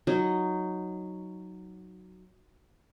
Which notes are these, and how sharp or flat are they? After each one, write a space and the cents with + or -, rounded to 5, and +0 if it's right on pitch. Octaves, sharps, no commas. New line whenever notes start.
F#3 +0 D#4 +0